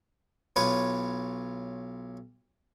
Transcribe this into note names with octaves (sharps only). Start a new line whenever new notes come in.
B1 F4 B4 C#5